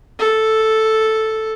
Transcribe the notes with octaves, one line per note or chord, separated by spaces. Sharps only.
A4